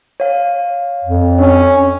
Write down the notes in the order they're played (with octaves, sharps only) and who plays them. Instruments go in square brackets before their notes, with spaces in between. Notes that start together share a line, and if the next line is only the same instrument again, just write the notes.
[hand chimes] C#5 F5
[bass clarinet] F2
[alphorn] C#4 [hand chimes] D4